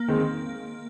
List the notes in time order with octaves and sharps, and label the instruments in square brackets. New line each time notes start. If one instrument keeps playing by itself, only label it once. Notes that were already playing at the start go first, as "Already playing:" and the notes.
Already playing: [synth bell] A#3
[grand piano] D#3 G#3 C4